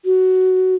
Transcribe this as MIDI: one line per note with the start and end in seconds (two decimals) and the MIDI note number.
0.05 0.75 66